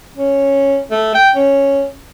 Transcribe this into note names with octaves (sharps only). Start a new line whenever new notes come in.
C#4
A3
G5
C#4